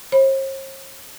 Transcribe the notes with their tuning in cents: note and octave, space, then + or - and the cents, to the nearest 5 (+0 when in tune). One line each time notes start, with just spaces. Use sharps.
C5 +45 B5 +0